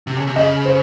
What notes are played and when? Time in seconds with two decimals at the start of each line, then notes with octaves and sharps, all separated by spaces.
0.07 C3
0.17 C#3
0.27 C3
0.36 C#3 D#5
0.65 C5